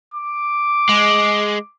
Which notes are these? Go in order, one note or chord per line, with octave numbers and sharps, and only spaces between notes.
D6
G#3